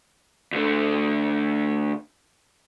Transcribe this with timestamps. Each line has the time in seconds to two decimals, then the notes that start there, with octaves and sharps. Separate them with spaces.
0.52 D2 D3